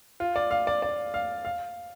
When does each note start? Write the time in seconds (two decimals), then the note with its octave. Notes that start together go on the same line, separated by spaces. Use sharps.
0.20 F4
0.36 D5
0.51 F5
0.67 D5
0.82 D5
1.14 F5
1.45 F5